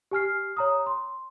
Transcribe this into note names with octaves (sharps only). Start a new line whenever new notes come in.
G4 G#5 F6 C7
C#5 A#5 D#6
C6